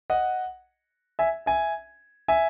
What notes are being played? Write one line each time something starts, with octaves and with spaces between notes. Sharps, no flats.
D#5 F#5
E5 G#5
E5 G#5
E5 G#5